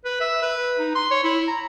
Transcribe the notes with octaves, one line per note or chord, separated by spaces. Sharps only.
B4
E5
B4
D#4
C6
C#5
E4
A#5